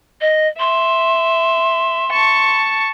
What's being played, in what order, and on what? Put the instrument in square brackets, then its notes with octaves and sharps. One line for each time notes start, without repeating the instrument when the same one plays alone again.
[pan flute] D#5
[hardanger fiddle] E5 [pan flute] C6
[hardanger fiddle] A5 C#6